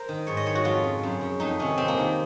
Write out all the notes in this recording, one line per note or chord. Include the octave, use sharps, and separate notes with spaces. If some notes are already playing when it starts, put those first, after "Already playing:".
Already playing: A#4 C5
D#3
G#2 C#5
D#5
D#3 C#5
F#4
F2 F4
C#3
F#2
C#3
F2 D#4
C3 D#3 C#4
F2 C4
A#3
C3 D#3